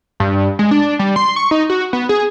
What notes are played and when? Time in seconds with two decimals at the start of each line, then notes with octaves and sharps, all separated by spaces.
0.20 G2
0.59 G#3
0.71 D4
0.99 G3
1.16 C6
1.36 C#6
1.51 D#4
1.70 F#4
1.93 B3
2.09 G#4